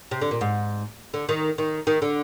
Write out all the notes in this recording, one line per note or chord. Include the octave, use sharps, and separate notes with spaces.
C3
D3
A#2
G#2
D3
D#3
D#3
D#3
D3